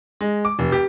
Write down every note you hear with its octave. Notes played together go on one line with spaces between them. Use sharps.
G#3
D6
F1
G4